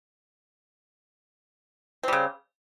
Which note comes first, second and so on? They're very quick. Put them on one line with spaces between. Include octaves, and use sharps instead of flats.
C4 G3 C#3